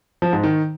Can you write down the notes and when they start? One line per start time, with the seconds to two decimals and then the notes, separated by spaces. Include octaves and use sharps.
0.22 F3
0.33 G#2
0.44 D#3